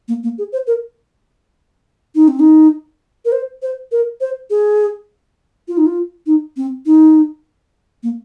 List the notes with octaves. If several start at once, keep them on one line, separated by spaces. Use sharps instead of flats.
A#3
A#3
G#4
C5
A#4
D#4
C4
D#4
A#4
C5
C5
A#4
C5
G#4
F4
D#4
F4
D#4
C4
D#4
A#3